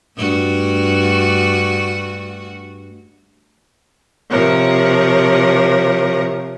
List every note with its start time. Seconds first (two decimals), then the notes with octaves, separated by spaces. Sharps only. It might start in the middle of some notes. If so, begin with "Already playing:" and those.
0.17 G2 A3 F#4
4.30 C3 F3 A#4 C#5